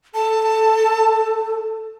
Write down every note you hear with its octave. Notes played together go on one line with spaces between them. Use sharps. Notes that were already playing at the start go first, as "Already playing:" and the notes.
A4 A5